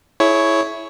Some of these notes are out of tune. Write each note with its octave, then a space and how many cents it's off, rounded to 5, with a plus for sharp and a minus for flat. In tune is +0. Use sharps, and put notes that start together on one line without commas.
E4 +0 G#4 +40 C#5 +0